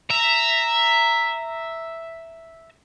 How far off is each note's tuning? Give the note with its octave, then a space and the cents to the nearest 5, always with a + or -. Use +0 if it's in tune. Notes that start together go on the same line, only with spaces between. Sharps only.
E5 +0 A#5 -10